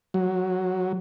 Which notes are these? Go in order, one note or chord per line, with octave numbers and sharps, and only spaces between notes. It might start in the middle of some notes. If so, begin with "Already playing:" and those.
F#3